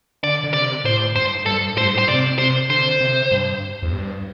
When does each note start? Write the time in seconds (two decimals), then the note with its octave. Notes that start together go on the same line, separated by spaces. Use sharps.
0.23 D3 D5
0.44 D3
0.53 C3 D5
0.84 A2 C5
1.15 G2 C5
1.46 G2 A4
1.77 A2 C5
1.85 G2
1.94 A2 C5
2.08 C3 D5
2.38 C3 C5
2.69 D3 C5
3.00 C3
3.31 G2
3.82 E2
3.93 G2